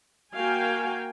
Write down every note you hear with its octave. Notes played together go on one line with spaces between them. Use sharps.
A#3 F#4 A#4 F5 G5 G#5